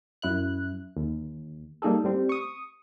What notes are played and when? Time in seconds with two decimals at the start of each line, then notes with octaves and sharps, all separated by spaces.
0.22 F#2 E4 F#6
0.97 D#2
1.82 G3 A#3 D#4 G#4 A4
2.04 A2 G3 C4
2.29 C#6 D#6